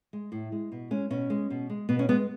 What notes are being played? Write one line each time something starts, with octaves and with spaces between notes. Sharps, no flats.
G#3
A2
G#3
B2
G#3 C#4
B2 C#4
G#3
B2
G#3
B2 B3
C#4
G#3 B3